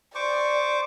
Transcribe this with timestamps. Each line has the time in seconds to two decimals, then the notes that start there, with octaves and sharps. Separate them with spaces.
0.15 C5 D5 C#6 D6